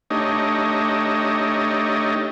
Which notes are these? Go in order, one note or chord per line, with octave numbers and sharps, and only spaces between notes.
A3 D4 D#4 G4 C#5 D#5